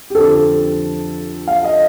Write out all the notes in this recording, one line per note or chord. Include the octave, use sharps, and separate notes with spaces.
G4
F2 D3 F3 C4 A4
F5
D#5